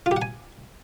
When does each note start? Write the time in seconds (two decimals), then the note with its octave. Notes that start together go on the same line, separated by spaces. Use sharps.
0.06 F4
0.11 G4
0.16 F#5
0.22 G#5